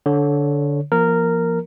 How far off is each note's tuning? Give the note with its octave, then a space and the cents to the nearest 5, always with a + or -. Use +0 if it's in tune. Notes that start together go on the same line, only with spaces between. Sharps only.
D3 -15 C#5 +0
F3 -25 A#3 +35 A#4 -10